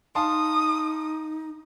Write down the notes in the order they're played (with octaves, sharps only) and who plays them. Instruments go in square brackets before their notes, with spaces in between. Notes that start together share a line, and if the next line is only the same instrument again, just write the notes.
[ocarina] D#4 [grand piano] F5 A5 C6 [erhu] D#6